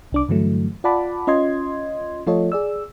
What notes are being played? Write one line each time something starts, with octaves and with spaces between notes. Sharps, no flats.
C2 D4 D6
G2 D3 E3 F#3 A3
F4 D5 F#5 A5 B5 D6
C#4 F4 D#5 C6 G#6
F3 A3 F4 A4 C#5 D#5
G#4 D5 E6